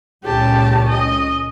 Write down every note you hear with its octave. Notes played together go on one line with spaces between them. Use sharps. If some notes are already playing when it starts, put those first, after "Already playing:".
C#2 A#2 C#4 G4 A5
D#5